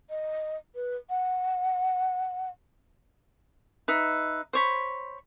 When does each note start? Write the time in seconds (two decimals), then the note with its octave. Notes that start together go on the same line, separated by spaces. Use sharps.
0.10 D#5
0.75 B4
1.10 F#5
3.88 D#4 B4 E5
4.53 C5 C#5 B5